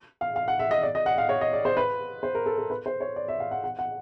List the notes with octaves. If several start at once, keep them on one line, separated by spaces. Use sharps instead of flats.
F5
F5
F#5
E5
D#5
D5
D#5
F#5
F5
C#5
D#5
D5
C5
B4
C5
A#4
A4
A#4
B4
C5
C#5
D5
E5
F5
F#5
F#5
F#5